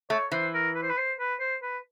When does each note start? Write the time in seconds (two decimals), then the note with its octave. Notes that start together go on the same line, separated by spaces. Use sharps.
0.10 A3 C#5
0.32 E3 C5
0.54 A#4
0.75 B4
0.83 C5
0.89 B4
0.97 C5
1.19 B4
1.40 C5
1.62 B4